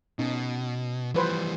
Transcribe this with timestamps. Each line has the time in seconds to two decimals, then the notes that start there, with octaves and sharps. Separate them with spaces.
0.19 B2 C#4 D#4
1.14 E3 F3 G3 B4 C5